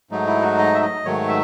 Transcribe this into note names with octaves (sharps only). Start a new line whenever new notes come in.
G#2 F#3 A3 D#4
E4
F#4
D#5
E5
D#5
G#2 D#3 F#3 A3 C#5
E5